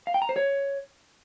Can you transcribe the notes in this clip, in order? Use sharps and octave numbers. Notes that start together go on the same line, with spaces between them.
F5
G5
A#5
C5
C#5